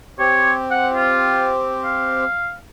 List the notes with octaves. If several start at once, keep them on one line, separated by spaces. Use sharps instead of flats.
C4 G4 C#5
F#5
F4
F5